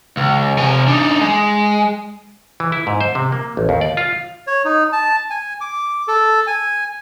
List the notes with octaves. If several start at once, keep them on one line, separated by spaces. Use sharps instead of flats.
C#2
C3 G#5
D4 D#4
G#3
E3
E4
G#2
C5
C3
A#3
A1
D#2
D5
F4
C#5
D#4
A5
G#5
D6
A4
G#5